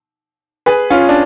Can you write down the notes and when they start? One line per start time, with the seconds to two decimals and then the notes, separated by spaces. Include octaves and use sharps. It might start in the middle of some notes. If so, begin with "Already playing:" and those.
0.66 G#4 B4
0.90 C#4 F4
1.09 D4